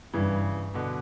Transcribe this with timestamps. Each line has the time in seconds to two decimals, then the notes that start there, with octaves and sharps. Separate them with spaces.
0.13 G2 C#3 E3
0.74 B2 D3